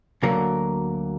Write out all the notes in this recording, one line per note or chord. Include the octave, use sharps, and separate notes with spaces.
D2 D3 F#3 A#3